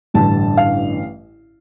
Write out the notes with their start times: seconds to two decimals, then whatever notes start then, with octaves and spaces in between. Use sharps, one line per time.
0.14 A1 G2 D3 A5
0.57 F5